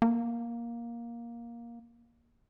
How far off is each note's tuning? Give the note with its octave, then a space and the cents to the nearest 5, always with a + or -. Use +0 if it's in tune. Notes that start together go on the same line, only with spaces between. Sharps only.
A#3 +10